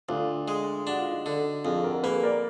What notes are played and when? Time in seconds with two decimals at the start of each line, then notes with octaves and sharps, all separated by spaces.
0.09 D2 D4 F4
0.48 G#3
0.87 D4 F#4
0.99 F4
1.11 D#4 F#4
1.26 D3
1.65 F2 F4 G#4
1.84 F#4 A#4
2.03 A#3 G#4 B4
2.23 A#4 D5